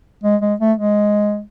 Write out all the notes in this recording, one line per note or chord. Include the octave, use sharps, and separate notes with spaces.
G#3
G#3
A3
G#3